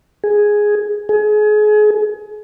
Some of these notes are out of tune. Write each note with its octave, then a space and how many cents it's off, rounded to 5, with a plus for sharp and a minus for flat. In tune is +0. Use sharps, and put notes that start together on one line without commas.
G#4 +0
G#4 +30